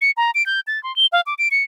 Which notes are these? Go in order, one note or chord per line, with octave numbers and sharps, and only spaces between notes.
C#7
A#5
D7
G6
A6
C6
G7
F5
D6
D7
C#7